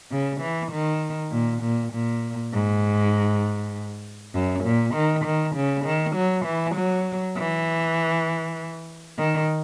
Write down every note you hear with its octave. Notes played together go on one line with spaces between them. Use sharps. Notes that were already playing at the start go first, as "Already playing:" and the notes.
C#3
E3
D#3
A#2
A#2
A#2
G#2
F#2
A#2
D#3
D#3
C#3
D#3
F#3
E3
F#3
E3
D#3